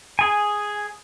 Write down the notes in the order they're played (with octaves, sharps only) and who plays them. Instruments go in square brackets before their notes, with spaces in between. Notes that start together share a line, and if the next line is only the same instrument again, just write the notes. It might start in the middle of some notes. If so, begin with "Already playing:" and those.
[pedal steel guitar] G#4 G#5